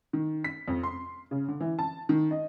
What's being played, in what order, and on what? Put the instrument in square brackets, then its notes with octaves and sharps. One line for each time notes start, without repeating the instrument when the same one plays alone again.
[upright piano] D#3
B6
F2
C6
C#3
D3
E3
A5
D#3
D#5